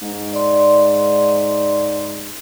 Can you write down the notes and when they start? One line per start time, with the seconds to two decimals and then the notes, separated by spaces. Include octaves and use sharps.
0.02 G#2
0.33 D5 C6